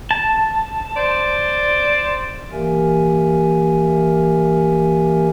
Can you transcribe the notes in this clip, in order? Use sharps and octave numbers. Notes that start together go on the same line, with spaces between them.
A5
C5 D5
E3 A#3 G4 A#4 E5 G#5